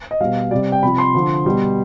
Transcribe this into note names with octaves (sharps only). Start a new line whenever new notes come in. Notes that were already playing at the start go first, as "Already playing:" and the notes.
D#5
B2 G3 F5
C3 G3 D5
G5
C3 F3 B5
C6
D3 F3
B2 G3